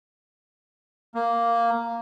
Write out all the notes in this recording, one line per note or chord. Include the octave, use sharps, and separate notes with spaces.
A#3